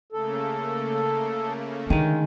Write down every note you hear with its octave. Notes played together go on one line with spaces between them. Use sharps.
C#3 A3 A#3 A4
D3 D#3 G#3